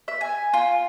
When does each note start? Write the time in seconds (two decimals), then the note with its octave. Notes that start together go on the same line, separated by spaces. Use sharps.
0.08 E5
0.21 G#5
0.54 F4